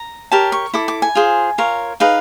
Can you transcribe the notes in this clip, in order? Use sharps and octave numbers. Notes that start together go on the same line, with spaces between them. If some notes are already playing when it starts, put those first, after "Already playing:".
Already playing: A#5
G4 A#4 C#5 A5
C#6
E4 A4 D6
D6
G#5
F4 G#4 C5
F4 A#4 C#5
D#4 G#4 B4 F5